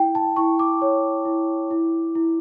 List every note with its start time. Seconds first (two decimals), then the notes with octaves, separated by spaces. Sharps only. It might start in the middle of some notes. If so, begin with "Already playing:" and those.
Already playing: E4 G5
0.15 A5
0.36 E4 C#6
0.59 D6
0.82 C#5
1.25 E4
1.71 E4
2.15 E4